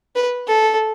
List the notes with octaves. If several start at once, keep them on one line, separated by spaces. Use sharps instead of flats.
B4
A4